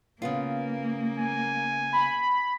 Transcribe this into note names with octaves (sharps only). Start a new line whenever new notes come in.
C#3 A#3 B3 F4
G#5
B5